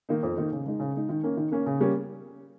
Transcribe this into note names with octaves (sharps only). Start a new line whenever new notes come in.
D#3 A#3 D#4
F2
D#3 A#3 D#4
C#3
G#3 D#4
C#3
G#3 D#4
D#3
A#3 C#4
D#3
A#3 C#4
C#3
G3 A#3 C#4